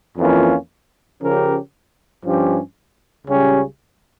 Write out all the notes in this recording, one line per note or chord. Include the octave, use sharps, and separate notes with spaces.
F2 E3 A#3 C#4 F4
C#3 F3 C#4 G4 A#4
G2 F3 C#4 G4
C#2 C#3 G3 C#4 G4